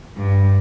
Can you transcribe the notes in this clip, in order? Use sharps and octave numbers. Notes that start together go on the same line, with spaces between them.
G2